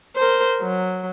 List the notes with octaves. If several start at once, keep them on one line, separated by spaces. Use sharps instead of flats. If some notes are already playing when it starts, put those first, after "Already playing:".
A#4 C5
F#3